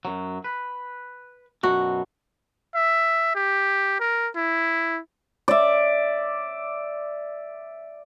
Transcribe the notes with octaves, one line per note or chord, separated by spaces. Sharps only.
F#2 F#3
B4
F#2 B2 F#3 F#4
E5
G4
A#4
E4
D5 E5